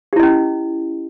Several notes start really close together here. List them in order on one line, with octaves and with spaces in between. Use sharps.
G4 E4 D#5 C#4